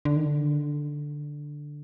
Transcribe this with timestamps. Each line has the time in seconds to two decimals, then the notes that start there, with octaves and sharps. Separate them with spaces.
0.05 D3
0.16 D#3
0.26 D3